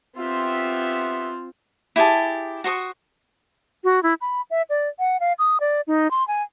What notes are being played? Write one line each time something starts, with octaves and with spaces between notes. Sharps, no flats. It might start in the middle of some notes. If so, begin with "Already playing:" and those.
B3 C4 F4 G4 E5
E4 G4 G#4 A5
F#4 C5 C#6 D#6
F#4
E4
B5
E5
D5
F#5
F5
D#6
D5
D#4
C6
G#5